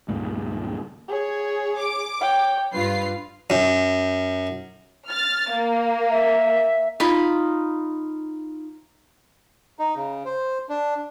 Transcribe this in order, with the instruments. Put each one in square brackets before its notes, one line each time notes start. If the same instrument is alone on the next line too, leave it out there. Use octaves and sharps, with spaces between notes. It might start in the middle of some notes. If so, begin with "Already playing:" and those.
[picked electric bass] C#2 G2 A#2 D#3
[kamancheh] G#4 C#5
[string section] D6
[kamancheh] C#5 G5
[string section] G2 F4 C7 [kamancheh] B4
[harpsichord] F#2
[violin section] F6 A6
A#3
[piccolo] E5
[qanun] D#4 F4 B5
[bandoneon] D#4
C#3
C5
D4